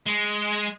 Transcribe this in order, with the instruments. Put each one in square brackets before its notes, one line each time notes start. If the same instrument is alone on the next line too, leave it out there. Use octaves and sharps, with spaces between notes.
[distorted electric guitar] G#3